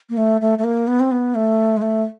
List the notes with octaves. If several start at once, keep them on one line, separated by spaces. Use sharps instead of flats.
A#3
A3
A3
A3
A#3
B3
C4
B3
A3
G#3
A3